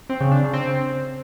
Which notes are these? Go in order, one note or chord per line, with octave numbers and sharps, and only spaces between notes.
C4
C#3
D4
C#3
C4